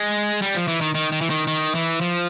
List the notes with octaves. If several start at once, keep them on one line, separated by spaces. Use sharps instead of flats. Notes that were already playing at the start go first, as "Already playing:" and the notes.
Already playing: G#3
G3
F3
E3
D#3
D#3
D#3
E3
D#3
D#3
E3
F3